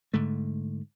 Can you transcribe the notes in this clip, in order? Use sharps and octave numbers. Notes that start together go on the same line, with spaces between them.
G#2 D3 A3